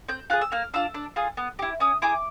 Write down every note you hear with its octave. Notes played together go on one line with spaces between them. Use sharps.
C4 G6
F4 G#4 F#6
E6
A#3 F6
D4 F4 E6
D4
F4 G#4
B3
E4 G4
C#4 D#6
E4 G#4 D6